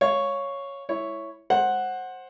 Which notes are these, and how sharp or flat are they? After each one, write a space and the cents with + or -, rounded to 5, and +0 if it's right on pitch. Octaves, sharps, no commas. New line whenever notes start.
C#5 +0 F5 +0
E4 +0 C#5 +0
C5 +20 F#5 +0